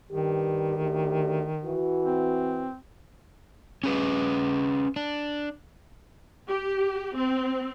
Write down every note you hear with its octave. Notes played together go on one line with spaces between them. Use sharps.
G2 D#3 G4
D2 G4
E3 F#4
C4
C#4 G#4 B4
D4
G4
C4